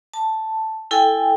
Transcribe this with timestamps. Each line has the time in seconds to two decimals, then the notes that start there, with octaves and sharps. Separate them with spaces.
0.14 A5
0.91 E4 A4 G5 G#5